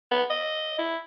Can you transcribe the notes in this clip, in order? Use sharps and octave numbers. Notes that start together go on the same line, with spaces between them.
B3
D#5
E4